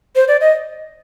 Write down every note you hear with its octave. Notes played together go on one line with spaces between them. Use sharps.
C5
D5
D#5